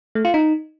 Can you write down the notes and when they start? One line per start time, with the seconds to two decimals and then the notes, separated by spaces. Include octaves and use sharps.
0.15 A3
0.25 F4
0.34 D#4